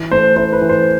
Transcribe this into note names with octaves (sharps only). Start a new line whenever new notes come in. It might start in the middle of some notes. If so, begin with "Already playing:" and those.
Already playing: E3
A3 C5
E4 C5
B4
E3
C5